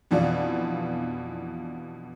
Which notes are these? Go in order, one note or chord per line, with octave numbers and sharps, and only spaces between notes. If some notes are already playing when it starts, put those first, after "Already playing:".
F2 B2 E3 B3 D4 F4